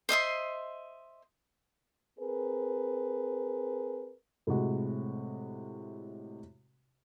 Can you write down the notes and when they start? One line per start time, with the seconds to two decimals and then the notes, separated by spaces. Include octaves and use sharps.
0.09 C5 D#5 E5 C6
2.19 C4 G#4 A#4 B4
4.47 A2 C3 G#3 F#4